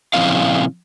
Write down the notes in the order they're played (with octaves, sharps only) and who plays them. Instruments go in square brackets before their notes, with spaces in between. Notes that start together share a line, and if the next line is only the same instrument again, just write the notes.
[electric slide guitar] A#2 C#3 F3 C4 E4 F5